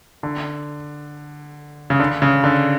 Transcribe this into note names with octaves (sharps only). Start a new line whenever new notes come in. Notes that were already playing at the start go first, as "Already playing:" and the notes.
D3
C#3
D3
C#3
D3